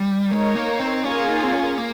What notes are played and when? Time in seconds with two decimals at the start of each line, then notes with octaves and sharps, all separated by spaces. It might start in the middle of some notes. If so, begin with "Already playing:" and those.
Already playing: G3
0.31 G#3 D#4 A#4 C#5
0.55 A#3
0.79 C4
1.04 A#3 C#4 F4 G#4 C#5 G#5
1.29 D#4
1.43 C4
1.52 C#4
1.78 A#3